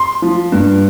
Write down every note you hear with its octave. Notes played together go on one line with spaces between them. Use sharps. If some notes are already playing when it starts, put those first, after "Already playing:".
Already playing: C6
F3
G2